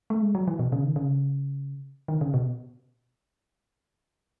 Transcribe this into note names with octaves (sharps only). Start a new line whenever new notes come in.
A3
G#3
F#3
E3
B2
C#3
D#3
C#3
D#3
C#3
B2